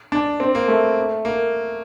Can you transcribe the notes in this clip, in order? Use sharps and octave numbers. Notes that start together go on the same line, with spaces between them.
D4
C4
A#3
A3
A#3